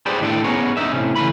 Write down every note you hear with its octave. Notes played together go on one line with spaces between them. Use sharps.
G4 G#4 B4 C5 D5 G5
A2 D#3 D4 A4 G5
B3 C#4 G#4 A#4 C#5
F#2 D4 D#4 E5
A2 C3 C#4
C#3 E3 A3 B4 B5